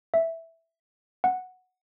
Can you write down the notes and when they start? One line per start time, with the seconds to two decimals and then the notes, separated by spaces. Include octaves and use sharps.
0.14 E5
1.24 F#5